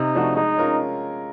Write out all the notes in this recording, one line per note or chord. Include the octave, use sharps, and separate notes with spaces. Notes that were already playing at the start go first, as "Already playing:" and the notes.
Already playing: C3 D#4
F3 A3 D4 F#4
G#3 D#4
C#4 F4 A#4 C#5